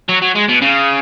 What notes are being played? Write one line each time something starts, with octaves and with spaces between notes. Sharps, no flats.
F#3
F#3
G#3
B2
C#3